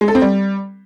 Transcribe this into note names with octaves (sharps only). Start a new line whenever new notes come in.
G#3
A4
C4
G3